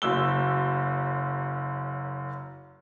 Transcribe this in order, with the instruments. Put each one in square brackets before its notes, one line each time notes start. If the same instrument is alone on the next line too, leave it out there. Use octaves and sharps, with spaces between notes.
[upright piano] F#1 F#2 E6 G7